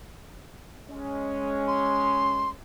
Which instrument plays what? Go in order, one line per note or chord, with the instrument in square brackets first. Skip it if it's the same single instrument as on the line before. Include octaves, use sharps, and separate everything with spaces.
[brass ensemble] G#3 C#4
[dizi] C6